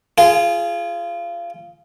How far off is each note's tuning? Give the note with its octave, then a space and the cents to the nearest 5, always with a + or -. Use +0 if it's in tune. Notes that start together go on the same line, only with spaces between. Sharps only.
F4 -25 G#4 +10